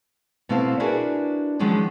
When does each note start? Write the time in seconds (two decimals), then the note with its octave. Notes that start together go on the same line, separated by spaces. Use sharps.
0.49 B2 A3 C4 E4 F5 A5
0.80 D4 E4 F#4 G#4 A#4 B4
1.59 D#3 F3 F#3 G#3 C#4 D4